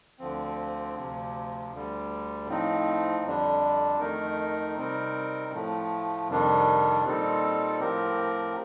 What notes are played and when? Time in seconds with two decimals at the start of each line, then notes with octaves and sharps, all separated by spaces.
0.19 D2 D3 F3 C4
0.95 D2 C3 F3
1.71 D2 D3 G3
2.47 A2 F3 C4 D#4
3.24 F2 D3 G3 D4
4.00 F2 D#3 A3 D#4 A#4
4.76 C3 G3 C4 D#4 A#4
5.52 A2 F3 A3
6.28 F2 C3 D#3 G3 D4
7.04 A#2 G3 C4 D#4 A4
7.80 A2 F3 C4 G4 A#4